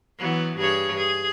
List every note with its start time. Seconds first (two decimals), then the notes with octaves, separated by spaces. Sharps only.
0.19 E3 F#3 B3
0.56 G2 G#4 C#5
0.96 G#4